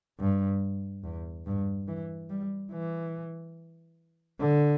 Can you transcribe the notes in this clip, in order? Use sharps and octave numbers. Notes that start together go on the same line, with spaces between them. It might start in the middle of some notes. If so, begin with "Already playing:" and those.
G2
E2
G2
E3
G3
E3
D3